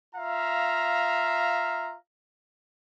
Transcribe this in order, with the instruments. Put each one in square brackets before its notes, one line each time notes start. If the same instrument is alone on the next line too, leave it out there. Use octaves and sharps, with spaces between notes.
[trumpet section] F4 E5 F5 A#5